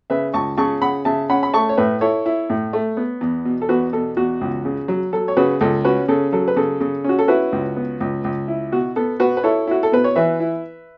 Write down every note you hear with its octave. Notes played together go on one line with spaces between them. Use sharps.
C#3 B4 E5
C#2 A5 C#6
C#3 A5 C#6
C#3 F#5 B5
C#3 E5 A5
C#4 F#5 B5
B5
A3 A5 C#6
C#5
A2 B4 E5
E4 A4 C#5
E4
A2
A3
B3
E2
B2
A4
E2 F#4 B4
B2 A4
E2 F#4
C#2
C#3
F#3
F#3 A4
C#5
C#3 F#4 B4
C#2 A4
C#4 F#4 B4
C#3 A4
F#3 A4
B4
C#3 A4
C#3
C#4 F#4
A4
E4 F#4 B4
C#2
B3
C#2
C#2
E4
B2 F#4
B3 A4
B2 F#4 B4
B4
E4 A4 C#5
E4 F#4
A4
B2 B4
C#5
E3 B4 E5
E4